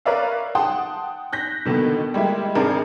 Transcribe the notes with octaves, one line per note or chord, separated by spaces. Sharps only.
A#4 B4 C#5 D5 E5 F5
F#5 G5 A5 C6 D#6
F#6 G6 A#6 B6
B2 D3 D#3 A#3 B3
G3 G#3 A#3 E4 G4
G#1 C4 D4 G#4 A#4